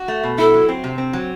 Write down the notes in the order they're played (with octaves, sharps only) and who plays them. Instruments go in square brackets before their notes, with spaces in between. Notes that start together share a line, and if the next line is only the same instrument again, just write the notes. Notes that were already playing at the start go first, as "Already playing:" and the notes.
Already playing: [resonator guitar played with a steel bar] F#4
A3
B2
[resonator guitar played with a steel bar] E4 [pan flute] A4
[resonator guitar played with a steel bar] F#3
C4
C3
C4
F#3